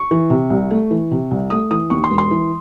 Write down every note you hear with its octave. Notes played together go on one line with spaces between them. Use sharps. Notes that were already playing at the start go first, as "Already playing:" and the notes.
Already playing: C#6
E3
C3
C2
A3
E3
C3
C2
A3 D#6
E3 D#6
D#2 C#6
C6
E1
C6
E3